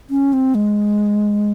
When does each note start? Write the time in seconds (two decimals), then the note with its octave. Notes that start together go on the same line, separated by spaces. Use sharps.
0.10 C#4
0.33 C4
0.55 G#3